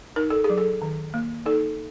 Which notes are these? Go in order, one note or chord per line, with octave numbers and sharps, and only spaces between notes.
D#4 A#4
A4
G#4
F#3
A4
D#3
A#3
D#4 A4